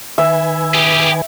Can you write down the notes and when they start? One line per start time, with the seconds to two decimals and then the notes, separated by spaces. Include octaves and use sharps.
0.18 D#3 B4 E5 G#5
0.74 G4 G#4